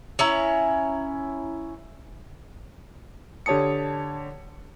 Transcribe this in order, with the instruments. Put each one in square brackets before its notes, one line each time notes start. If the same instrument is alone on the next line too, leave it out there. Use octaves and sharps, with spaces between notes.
[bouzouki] C#4 E4 A#5
[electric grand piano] D3 G4 C#5 A5 D#6 C#7